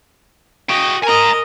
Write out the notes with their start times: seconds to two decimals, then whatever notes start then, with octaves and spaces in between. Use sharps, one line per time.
0.70 F#4 D#5 G5
1.04 A#4 D#5 G#5 A#5